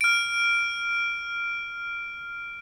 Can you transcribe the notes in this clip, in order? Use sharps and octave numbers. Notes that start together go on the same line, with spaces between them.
F6 D7